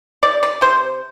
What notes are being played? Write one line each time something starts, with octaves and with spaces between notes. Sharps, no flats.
C3 D5
D5
C3 C5